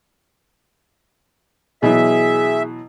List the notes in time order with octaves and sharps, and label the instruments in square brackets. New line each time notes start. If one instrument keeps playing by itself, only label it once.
[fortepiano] B2 E3 F#3 [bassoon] G#4 [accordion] E5